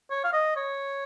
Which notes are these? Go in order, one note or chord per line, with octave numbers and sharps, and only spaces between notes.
C#5
F5
D#5
C#5